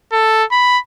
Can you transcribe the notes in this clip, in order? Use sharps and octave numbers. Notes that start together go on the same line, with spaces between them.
A4
B5